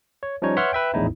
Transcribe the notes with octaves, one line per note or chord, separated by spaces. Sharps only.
C#5
F3 G3 C#4 D#4 C#5
B4 C#5 E5 F#5 C6 F6
B4 E5 G5
A#1 E2 A2 D#4 E4